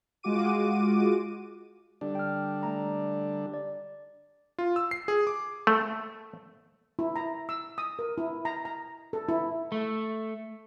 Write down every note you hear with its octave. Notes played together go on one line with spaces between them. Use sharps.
G#3 F4 F#4 D6 D#7
D3 G3 D4
G5 F6
A3 A#5
D5
F4
E6
C7
G#4
D6
A3
E4
A#5
E6
D#6
A#4
E4
A#5
A#5
A4
E4
A3